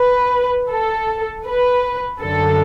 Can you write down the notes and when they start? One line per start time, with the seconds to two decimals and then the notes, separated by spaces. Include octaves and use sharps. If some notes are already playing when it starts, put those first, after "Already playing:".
Already playing: B4
0.70 A4
1.45 B4
2.20 F#2 D3 A4